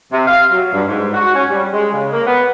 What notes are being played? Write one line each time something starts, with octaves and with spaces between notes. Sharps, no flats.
C3
F5
F#3
G2
G#2
F#4
C#4
G3
G#3
C#3
A#3
B3